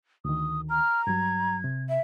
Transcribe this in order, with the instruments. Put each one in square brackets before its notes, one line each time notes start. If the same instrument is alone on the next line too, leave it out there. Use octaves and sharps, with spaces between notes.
[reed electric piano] D2 D#3 [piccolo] D#6
[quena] A#5 [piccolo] F6
[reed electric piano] G2 F#3 [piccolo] G#6
[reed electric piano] C3
[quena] E5